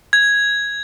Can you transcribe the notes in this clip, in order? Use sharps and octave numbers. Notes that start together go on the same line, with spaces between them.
G#6